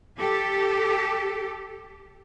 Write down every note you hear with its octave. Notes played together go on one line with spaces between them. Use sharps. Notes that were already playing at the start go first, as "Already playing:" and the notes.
G4 A4